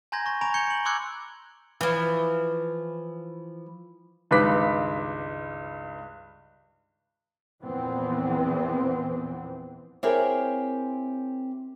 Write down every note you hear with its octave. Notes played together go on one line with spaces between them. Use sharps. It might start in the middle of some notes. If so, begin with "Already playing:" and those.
G#5 A#5 C6 G6 G#6 A#6
C#6 A#6
G#5 A#5 B5 C#6 D7 F7
G6 G#6 C#7 G7
C#7 F#7
C6 D6 E6 F#6 G#6 C#7
E3 F3
C#2 G2 D#3 B4 D6 B6
E2 A#2 E3 F3 B3 C4
C4 E4 G4 G#4 A#4 C#5